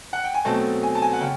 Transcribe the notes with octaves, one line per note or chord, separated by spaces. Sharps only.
F#5
G5
G#5
B2 F#3 A3 C4 A5
G#5
A5
G#5
F#5
C#3 G5